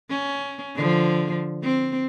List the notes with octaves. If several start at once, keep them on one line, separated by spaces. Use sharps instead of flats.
C#4
D3 F3
C4